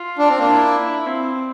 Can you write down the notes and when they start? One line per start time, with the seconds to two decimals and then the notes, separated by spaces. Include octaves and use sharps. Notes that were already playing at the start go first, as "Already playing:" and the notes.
Already playing: F4
0.19 D4
0.29 C4
0.38 A#3 D4
0.48 E4
1.06 C4